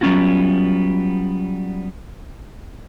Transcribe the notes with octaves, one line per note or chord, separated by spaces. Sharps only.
F#3 G3 B3 C#4 F4 F#4